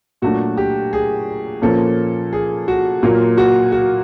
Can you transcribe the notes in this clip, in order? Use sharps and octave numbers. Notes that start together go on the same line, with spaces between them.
A#2 F#3 A3 D4 F#4
G4
G#4
A#2 F3 A#3 C#4 A4
G#4
F#4
A#2 F#3 A#3 F4
F#4
F#4